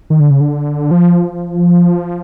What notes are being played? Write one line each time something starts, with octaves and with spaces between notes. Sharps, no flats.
D#3
D3
C#3
D3
F3